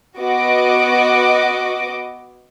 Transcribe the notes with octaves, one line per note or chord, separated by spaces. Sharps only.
B3 F#4 D#5 D6